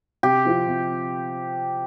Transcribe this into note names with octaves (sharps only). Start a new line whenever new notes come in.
C3 G4
F3 C4 F4
C3